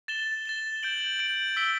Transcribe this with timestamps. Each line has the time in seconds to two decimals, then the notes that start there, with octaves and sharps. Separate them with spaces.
0.08 A6 E7 G7
0.46 A6 E7 G7
0.83 G6 D7 F#7
1.19 G6 D7 F#7
1.57 E6 B6 D7 G7